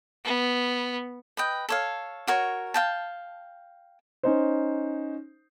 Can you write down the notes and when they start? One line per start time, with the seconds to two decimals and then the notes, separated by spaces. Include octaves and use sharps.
0.24 B3
1.37 B4 D#5 G5
1.69 A4 C#5 F5
2.27 F#4 A#4 C#5
2.74 F5 G5 A5
4.23 C#4 D#4 C5